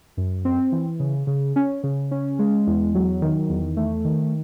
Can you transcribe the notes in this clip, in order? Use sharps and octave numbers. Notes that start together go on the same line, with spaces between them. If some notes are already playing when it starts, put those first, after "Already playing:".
F#2
C4
E3
C#3
C#3
C#4
C#3
C#4
G#3
E2
F#3
D#3
E2
A3
D#3